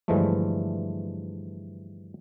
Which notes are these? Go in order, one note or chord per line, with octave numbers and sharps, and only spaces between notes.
G2 D3 E3 F3 G#3 A3